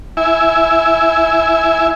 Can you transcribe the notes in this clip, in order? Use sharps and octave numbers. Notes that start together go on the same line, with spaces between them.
E4 E5 G#5